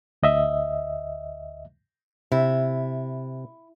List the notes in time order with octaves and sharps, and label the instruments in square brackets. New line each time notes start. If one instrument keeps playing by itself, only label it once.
[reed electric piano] D2 D#5 E5
[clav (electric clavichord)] C3 [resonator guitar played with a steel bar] E4